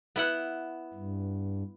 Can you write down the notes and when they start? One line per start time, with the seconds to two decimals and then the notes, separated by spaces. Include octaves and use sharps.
0.16 B3 E4 F#5
0.94 G2